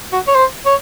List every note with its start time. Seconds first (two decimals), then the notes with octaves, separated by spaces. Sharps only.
0.12 F#4
0.27 C#5
0.35 C5
0.66 C#5